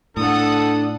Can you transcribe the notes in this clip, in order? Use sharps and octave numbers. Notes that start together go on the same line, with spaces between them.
A2 D4 A4 F#5 D#6